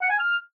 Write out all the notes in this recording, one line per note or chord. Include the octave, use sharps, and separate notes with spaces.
F#5
G#5
F6